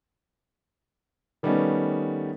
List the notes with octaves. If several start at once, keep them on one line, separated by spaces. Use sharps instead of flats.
D#3 G3 A3 B3 C#4 D#4